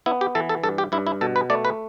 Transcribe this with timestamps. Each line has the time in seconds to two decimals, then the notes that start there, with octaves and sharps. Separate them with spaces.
0.06 B3 E4
0.21 G4
0.35 E3 A4
0.49 A4
0.63 G2 A4
0.78 G4
0.92 G2 E4
1.07 E4
1.21 B2 A4
1.36 B4
1.50 A3 D5
1.65 B4